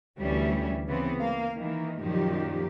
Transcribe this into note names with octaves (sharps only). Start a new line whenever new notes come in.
D2 E3 G3 C#4 E5
C#3 E3 B3 C4
A#3 F5
D#3 E3 A#3
F#2 A#2 D#3 F3 G4